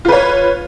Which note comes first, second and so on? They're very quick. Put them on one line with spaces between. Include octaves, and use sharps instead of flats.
F4 B4 C#5